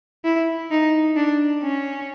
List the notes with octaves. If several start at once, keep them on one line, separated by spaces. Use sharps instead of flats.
E4
D#4
D4
C#4